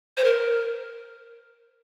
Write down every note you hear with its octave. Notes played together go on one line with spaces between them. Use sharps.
C5
A#4